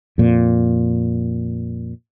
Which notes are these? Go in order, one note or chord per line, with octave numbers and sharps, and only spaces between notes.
F2 A#2